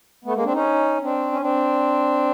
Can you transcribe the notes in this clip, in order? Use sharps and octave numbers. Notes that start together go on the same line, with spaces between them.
A3 B3
G#3 A#3
C4 D4
C#4 D#4
C4 D4
C#4
C4 D4